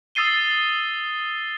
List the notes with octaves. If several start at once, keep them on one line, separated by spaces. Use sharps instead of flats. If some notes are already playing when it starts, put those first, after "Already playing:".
D#6 E6 A6 C7 D#7 G7